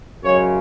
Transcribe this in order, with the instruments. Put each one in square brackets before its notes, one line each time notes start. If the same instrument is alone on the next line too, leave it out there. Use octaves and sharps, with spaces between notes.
[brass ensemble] F#2 C#3 G#3 C#5